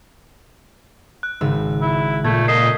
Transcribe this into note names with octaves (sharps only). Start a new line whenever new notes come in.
F#6
G#1 C#3 E6
E4
A#2 A3 A4 G6 G#6
A#3 D#5 B6 C7 E7